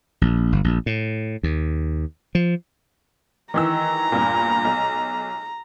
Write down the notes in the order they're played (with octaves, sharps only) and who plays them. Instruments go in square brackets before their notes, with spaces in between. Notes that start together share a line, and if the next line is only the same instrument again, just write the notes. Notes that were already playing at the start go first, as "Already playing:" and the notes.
[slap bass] A#1
G1
A#1
A2
D#2
F3
[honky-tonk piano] D#3 E3 E6 [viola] A#5
[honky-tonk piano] E2 G2 A#2
B1